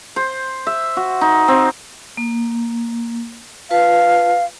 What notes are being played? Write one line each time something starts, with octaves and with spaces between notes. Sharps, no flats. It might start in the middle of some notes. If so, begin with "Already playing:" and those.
C5
E5
F#4
D#4
C4
A#3
F4 B4 F5 A5